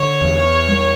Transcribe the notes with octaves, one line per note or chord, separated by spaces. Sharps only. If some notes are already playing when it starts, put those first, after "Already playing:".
Already playing: D3 C#5
E2
G3